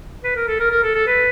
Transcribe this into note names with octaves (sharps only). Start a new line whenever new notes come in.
B4
A#4
A4
A#4
A#4
A4
A4
B4